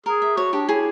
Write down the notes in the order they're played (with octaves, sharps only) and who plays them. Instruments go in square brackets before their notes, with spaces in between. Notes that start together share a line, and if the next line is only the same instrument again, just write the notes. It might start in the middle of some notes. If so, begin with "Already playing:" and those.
[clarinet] G#4 [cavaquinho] A#4
[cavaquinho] E5
[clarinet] F#4 [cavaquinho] C#5
[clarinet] D4 [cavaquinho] G4
[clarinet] E4 [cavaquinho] G#4